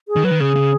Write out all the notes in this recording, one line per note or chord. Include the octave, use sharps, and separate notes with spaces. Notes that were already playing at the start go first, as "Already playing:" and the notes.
G#4
D#3
F#3 B4
D#3
C#3 G#4
C#3